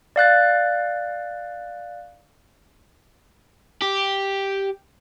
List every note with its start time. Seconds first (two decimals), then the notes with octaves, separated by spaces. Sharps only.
0.16 D5 F5 F#6 A6
3.82 G4